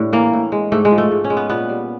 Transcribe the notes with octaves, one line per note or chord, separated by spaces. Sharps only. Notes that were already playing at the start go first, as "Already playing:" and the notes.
Already playing: A2 G3 D4
E3 A#3
A2
G#3
G#2 A3
G#3
F3
A3
G#2
C#4
G#3
B3
A#2 B3
G3